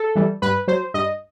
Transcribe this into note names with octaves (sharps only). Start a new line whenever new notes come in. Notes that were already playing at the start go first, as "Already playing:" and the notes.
Already playing: A4
E3 G3
G2 B4
F#3 C5
G2 D#5